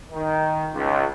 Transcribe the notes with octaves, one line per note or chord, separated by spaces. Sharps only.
D#3
C#2